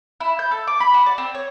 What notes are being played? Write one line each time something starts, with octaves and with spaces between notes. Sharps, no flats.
E4
G6
A4
D6
B5
F#4
D5
C4
C#5